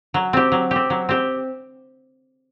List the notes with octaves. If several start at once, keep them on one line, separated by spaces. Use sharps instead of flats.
F#3
C4 G4
F#3
C4 G4
F#3
C4 G4